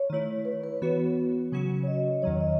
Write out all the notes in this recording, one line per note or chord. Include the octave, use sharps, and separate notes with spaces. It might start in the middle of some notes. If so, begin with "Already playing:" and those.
Already playing: C#5
D#3 A3 E4
B4
B4
E3 B3 F#4
C#3 F#3 C#4 F#4
C#5
D#5
E2 D#3 F#3 C#5
D#5